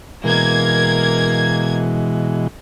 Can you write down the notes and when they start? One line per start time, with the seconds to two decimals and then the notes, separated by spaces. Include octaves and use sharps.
0.24 B2 E3 G#3 A#3 G#6